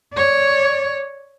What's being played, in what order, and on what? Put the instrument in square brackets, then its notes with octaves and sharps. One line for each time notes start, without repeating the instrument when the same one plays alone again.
[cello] C#5 D5